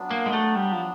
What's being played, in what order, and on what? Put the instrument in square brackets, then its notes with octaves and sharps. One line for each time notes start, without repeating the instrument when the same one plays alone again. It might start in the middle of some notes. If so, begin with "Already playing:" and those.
Already playing: [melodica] F#3 B3 D4
[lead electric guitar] A#3
G#3
A3
G3
F3